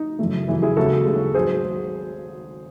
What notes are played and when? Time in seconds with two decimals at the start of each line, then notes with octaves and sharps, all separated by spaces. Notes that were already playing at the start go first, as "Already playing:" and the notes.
Already playing: D#4
0.19 F#1 F#2 E3 A3
0.48 F#1 F#2 E3 A3
0.62 E4 G#4
0.76 D#2 C#3 G#3 F#4 A4
1.06 D#2 C#3 G#3
1.34 G#1 F#3 G#4 C5